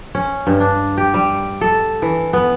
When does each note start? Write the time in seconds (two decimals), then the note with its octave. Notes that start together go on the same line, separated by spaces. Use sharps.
0.15 C#4
0.47 G2
0.60 D4
0.97 G4
1.14 G3
1.61 A4
2.02 E3
2.33 B3